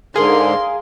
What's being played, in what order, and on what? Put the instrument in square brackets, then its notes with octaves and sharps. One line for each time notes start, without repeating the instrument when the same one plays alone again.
[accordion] G#2 D3 [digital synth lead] G#4 [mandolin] A#4 F5 [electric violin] C6